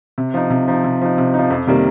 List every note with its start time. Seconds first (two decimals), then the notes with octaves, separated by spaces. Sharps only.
0.18 C3
0.34 F3 D#4
0.50 C3
0.68 F3 D#4
0.84 C3
1.02 F3 D#4
1.18 C3
1.34 F3 D#4
1.51 F2
1.67 C3 D#3 G3 A#3